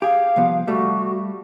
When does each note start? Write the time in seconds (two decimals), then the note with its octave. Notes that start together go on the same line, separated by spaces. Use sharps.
0.02 G4 G#4 F5
0.36 C2 F3 B3
0.68 G3 A3 F#4